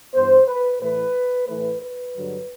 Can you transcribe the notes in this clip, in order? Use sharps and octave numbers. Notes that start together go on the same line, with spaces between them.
G2 E3 B3 C5
B4
A2 E3 A3 B4
A2 E3 A3 B4
B4
G2 D3 F#3